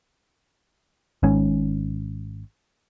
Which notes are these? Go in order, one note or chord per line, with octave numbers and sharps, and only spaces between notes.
G#1 G#2 C#4